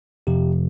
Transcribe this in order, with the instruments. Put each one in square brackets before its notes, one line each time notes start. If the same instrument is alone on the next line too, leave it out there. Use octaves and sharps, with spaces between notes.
[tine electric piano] F2 C3 F3 G4